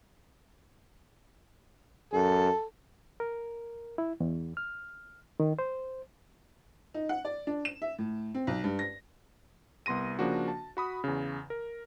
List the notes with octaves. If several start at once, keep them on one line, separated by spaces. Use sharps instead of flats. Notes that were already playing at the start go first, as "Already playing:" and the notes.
F#2 A4
A#4
E4
E2
F6
D#3
C5
D#4
F#5
D5
D4
E7
E5
A2
C4
B1
G2
A#6
C2 B3 C6 A#6 D#7
C#3 F3 A#3 D4 F#4
A5
F#4 B5 D#6
E2 C#3
A#4